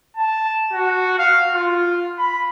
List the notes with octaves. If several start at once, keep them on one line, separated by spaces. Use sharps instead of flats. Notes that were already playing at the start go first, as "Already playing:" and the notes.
A5
F#4
F5
F4
B5